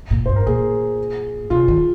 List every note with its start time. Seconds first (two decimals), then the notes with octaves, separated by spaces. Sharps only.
0.11 A#2
0.26 G2 C5
0.36 A#4
0.46 A#2 G#4
1.50 C3 F4
1.68 D#3